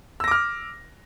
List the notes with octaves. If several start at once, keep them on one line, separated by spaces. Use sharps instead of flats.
D6 E6 F6 A#6